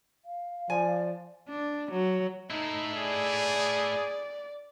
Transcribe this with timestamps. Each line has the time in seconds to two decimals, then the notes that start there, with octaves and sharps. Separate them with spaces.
0.25 F5
0.70 F3 D5 G#5
1.49 D4
1.91 F#3
2.51 A3 D#4 E4
2.98 G#4 D5